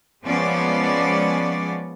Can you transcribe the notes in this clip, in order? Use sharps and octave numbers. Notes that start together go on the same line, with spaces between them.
F3 G#3 B3 C#4 D5